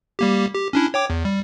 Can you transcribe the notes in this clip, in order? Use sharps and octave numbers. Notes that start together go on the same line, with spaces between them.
G3 A#3 G4
G4
C#4 D4 E4
C#5 G5 D6
E2
G3